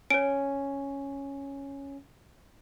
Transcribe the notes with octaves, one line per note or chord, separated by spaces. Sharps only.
C#4 C#5 D7